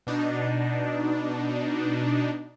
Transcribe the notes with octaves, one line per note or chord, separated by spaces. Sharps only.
B2 D4 D#4